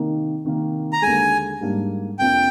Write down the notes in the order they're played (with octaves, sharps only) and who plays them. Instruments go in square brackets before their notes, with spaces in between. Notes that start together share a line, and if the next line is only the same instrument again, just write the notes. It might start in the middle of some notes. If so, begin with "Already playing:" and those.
Already playing: [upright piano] C3 D#3 A#3 D#4
C3 D#3 A#3
[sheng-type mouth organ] A#5
[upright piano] D#2 D3 G#3 [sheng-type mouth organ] G#5
[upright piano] G#2 G3 A#3 D4
[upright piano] F2 C3 F3 A#3 D4 [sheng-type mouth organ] G5